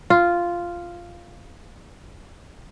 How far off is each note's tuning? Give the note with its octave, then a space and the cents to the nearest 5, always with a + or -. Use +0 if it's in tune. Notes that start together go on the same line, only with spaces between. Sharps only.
F4 -5